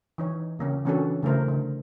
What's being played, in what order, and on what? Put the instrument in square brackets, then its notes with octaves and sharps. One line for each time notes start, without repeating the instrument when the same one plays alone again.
[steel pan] E3 D#4 C#5
C#3 A#3 C#4
E3 A#3 C#4 D4 F#4 A4
C#3 A3 E4 A#4 C5
D3